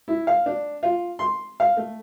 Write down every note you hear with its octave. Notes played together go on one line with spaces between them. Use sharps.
E4
F5
D4
F4
C6
F5
A3